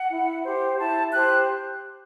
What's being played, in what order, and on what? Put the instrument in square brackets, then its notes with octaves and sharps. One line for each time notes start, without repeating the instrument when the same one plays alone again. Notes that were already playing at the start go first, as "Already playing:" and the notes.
Already playing: [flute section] F#5
E4
G4 C5
E4 A5
G4 C5 F#6